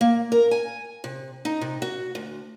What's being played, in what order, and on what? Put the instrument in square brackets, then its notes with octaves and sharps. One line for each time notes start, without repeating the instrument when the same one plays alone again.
[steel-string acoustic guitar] A#3
A#4
G#5
C3
D#4
C3
F#4
D2